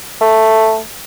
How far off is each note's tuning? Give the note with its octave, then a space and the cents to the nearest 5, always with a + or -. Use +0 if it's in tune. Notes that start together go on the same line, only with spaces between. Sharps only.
A3 +5